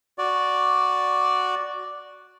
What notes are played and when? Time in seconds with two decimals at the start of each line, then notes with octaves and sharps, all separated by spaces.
0.18 F#4 D5